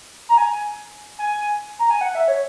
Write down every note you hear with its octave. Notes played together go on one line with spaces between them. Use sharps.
A#5
G#5
G#5
A#5
G#5
F#5
E5
C#5